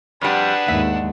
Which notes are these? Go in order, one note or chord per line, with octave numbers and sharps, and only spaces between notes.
F2 G3 D4 G#4 B4 F#5
D#2 G#2 E5